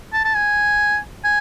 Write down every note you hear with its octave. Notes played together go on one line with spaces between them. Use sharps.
A5
A5
G#5
G#5